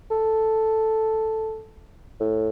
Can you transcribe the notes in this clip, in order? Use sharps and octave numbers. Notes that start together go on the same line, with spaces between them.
A4
A2